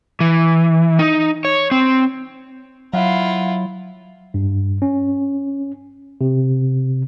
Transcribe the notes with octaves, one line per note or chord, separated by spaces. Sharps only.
E3
D#4
C#5
C4
F#3 E4 F4 F5 F#5
G2
C#4
C3